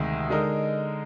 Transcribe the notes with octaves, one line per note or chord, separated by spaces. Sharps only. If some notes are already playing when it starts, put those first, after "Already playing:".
Already playing: D2 C3 D#3 G#3
D3 G#3 D#4 A#4